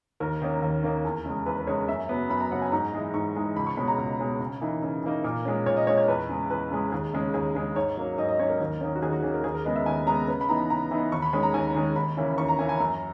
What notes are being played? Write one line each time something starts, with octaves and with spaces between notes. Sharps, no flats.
D#2 A#4
D#3 A#3 C#4
D#2
D#3 A#3 C#4
E2
C#3 G#3
E2 B4
B4
C#3 G#3 C#5
F#2 E5
C#3 F#3 B3
F#2 B5
A#5
C#3 F#3 B3 F#5
G#5
G#2 A#5
E3 G#3 D#4
G#2 C#6
E3 G#3 D#4
C#2 B5
C#6
B2 G#3 C#4 B5
A#5
C#2
B2 G#3 C#4
C#3
E3 A#3 D#4
C#3
E3 A#3 D#4
A#2 A#4
G#3 C#4
A#2 C#5
D#5
G#3 C#4 C#5
C#5
E2 B4
C#3 G#3
E2 B4
C#3 G#3
D#2 G#4
C#3 G#3 C#4
D#2 G#4
C#3 G#3 C#4
G#2 C#5
F#3 A#3 C#4
G#2 D#5
D#5
F#3 A#3 C#4 C#5
A#4
D#2
D#3 A#3 C#4
F#4
D#2 G#4
F#4
D#3 A#3 C#4 G#4
A#4
D#2 G#4
A#4
C#3 G#3 B3 D#5
E5
D#2 G#5
C#3 G#3 B3 A#5
C#3 B4
B5
E3 B3 D#4 A#5
C#3 A#5
E3 B3 D#4
D#2 C#6
B5
D#3 G#3 C#4 B5
A#5
D#2 G#5
D#3 G#3 C#4
D#2 B5
C#3 E3 A#3 C#4
D#2 C#6
A#5
C#3 E3 A#3 C#4 G#5
G#5
F#2 A#5